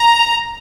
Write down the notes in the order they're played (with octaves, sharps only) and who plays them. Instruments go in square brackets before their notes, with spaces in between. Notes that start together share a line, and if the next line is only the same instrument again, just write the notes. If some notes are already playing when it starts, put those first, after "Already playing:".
Already playing: [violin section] A#5